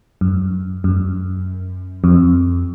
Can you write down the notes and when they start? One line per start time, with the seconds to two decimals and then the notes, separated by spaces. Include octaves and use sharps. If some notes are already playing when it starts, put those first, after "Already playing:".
0.21 F#2
0.84 F#2
2.04 F2